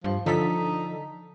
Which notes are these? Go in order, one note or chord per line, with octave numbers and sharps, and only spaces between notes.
G2 F3
D3 F3 D#4 A4 B6